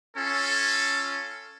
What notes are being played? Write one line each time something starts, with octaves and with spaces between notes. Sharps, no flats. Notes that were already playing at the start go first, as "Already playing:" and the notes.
C#4 F4 A4